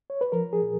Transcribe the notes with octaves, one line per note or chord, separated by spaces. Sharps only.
C#5
B4
F3 A#4
G#4
A#2